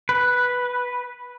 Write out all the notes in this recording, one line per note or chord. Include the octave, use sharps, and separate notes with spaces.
B4